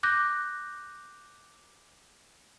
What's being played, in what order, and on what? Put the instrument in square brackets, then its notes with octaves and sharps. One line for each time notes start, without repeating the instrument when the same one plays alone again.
[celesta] D6 F#6 G6 A#6